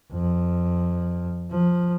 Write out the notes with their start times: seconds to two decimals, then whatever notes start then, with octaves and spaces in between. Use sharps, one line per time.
0.12 F2
1.51 F3